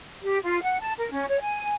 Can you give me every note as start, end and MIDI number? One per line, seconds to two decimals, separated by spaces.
0.22 0.38 67
0.43 0.62 65
0.62 0.79 78
0.80 0.92 81
0.98 1.11 70
1.11 1.25 61
1.29 1.40 73
1.40 1.73 80